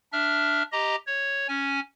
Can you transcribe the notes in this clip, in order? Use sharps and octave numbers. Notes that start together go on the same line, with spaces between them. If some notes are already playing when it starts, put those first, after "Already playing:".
D4 E5 F6
G4 D#5 A#5
C#5
C#4 G#5